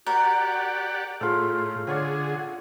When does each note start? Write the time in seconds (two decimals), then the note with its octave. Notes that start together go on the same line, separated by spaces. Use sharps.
0.06 F#4 G4 A#4 D5 F#5
1.21 A2 A3 C#4 F4 G#4
1.87 D3 C#4 G#4 C#5 D5 F#5